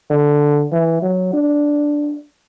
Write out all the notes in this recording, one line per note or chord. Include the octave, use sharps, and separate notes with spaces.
D3
E3
F#3
D4